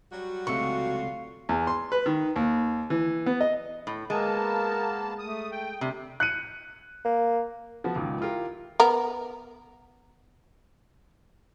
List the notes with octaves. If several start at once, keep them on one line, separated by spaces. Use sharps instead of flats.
F#3 G3 F#4
C#2 C3 A3 F4 C#6
E2
C6
B4
D#3
D#2
E3
B3
D#5
A2
G#3 A#3 B3 A#4 A5
A3 D#6
G5
C3 G3
F#6 C#7 D#7
A#3
F3 B3 F#4
C#2 A#2 D#3
E4 F4 G4 A#4
B3 A#4